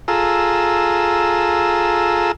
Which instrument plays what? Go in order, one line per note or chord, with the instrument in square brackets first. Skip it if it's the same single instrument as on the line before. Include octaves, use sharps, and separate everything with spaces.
[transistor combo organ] F4 G#4 A4 A#5 E6